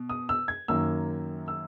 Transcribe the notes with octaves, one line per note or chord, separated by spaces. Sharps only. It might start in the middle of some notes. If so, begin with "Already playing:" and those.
Already playing: B2
D#6
E6
G#6
F#2 D#3 A#3 E6
E6